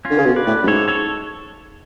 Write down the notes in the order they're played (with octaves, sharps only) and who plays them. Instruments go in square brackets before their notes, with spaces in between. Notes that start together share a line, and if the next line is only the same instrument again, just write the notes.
[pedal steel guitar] C#4 F4
[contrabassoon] D3
C#3
B2
[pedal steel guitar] B4 D5
[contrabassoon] A2
F#2
[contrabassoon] G#2 [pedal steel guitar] A4 C#5
[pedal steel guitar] A4 C#5